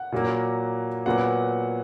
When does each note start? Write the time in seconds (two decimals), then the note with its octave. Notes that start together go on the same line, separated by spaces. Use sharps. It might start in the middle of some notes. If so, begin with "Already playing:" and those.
Already playing: F#5
0.12 A#2 F#3 A#3
1.06 A#2 F#3 B3 F#5